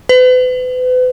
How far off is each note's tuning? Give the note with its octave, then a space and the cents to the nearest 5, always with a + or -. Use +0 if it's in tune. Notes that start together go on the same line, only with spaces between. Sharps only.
B4 +40